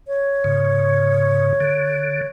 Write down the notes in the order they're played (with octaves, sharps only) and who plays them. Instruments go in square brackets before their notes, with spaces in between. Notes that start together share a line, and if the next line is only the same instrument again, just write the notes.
[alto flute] C#5
[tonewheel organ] G#2 C#3
D3